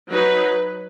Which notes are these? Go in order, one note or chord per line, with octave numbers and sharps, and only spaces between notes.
F#3 D#4 B4